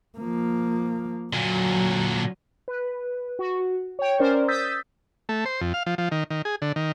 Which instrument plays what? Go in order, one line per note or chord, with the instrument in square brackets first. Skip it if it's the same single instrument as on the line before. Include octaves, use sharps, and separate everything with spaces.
[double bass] F3 A#3
[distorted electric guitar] A#2 D3 [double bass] F#3
[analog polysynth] B4
F#4
C#5 G5
C#4 A#4 C5 D5
D#6 E6 G6 A6 B6
[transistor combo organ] A3
C5
F2
F5
F3
F3
D#3
D#3
G#4
D3
D#3